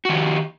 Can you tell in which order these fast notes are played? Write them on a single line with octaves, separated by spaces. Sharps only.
F#4 D#3 G4